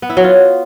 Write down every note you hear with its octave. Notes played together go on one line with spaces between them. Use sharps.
B3
E4
F#3
F4